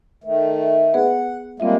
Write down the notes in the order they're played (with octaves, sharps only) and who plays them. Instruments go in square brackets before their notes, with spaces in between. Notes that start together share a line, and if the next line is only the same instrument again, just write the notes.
[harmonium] D#3 A3
[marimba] B3 G#4 B4 [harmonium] F#5
[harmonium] G3 G#3 A#3 [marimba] C4 F4 E5